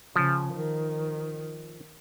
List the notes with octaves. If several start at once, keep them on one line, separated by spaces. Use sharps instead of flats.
C#3 F3
D#3